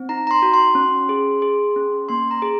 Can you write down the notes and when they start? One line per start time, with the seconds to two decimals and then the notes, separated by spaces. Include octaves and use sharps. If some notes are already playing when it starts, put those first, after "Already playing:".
Already playing: C4
0.09 D#4 A#5
0.27 A#5
0.31 C6
0.42 F#4
0.54 C6
0.75 C#4
1.09 G#4
1.42 G#4
1.76 C#4
2.09 A#3 C6
2.31 A#5
2.42 G#4